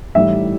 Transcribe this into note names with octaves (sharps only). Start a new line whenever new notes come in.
A1 A2 G3 D#4 E5